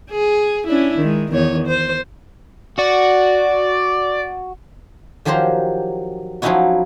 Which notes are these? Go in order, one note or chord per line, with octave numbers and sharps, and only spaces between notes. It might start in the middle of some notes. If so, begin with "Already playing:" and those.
G#4
C#4 D4 E4
D#3 G#3
E2 D#3 C#5
C5
F#4 D5
D#3 F3 F#3 G4 C5 A#5
F3 F#3 C#4 D#4 E4 F#4